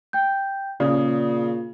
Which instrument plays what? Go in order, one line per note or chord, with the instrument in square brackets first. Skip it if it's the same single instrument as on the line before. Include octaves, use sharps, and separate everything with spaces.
[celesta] G5 G6
[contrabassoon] A#2 [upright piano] C#3 [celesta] D5 D#6